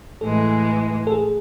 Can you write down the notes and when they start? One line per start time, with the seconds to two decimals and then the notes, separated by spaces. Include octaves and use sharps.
0.20 A2 E3 G#3 A4
1.07 A4
1.12 G#4